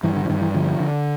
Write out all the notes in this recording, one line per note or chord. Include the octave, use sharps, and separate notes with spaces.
G2 E3
D3
E3
G2 D#3
E3
D3 F3
D3